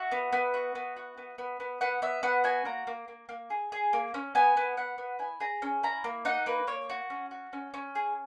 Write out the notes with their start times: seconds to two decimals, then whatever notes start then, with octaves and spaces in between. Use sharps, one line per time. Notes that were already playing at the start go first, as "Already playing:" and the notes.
Already playing: F#4 E5
0.12 B3
0.33 B3
0.54 F#4
0.75 B3
0.97 F#4
1.18 B3
1.38 B3
1.60 B3
1.81 B3 F#5
2.02 B3 E5
2.23 B3 F#5
2.44 F#4 G#5
2.65 A#3 A#5
2.87 A#3
3.08 A#3
3.29 A#3
3.50 G#4
3.72 G#4
3.93 A#3
4.14 C#4
4.35 B3 G#5
4.57 B3
4.77 B3 F#5
4.98 B3
5.19 E4 G#5
5.40 G#4 A#5
5.62 C#4
5.83 E4 A#5
6.04 A#3
6.25 D#4 F#5
6.46 A#3 B4
6.67 A#3 C#5
6.90 F#4
7.10 C#4
7.31 F#4
7.53 C#4
7.74 C#4
7.95 G#4